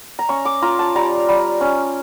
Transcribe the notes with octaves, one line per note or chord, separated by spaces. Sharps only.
A#5
C#4 C#6
D6
F4 A#5
A5
G3 A#5
G3
C#4